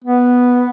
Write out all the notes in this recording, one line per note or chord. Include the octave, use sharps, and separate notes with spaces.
B3